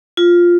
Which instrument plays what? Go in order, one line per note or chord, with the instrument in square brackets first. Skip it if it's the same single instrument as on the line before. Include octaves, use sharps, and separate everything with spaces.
[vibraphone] F4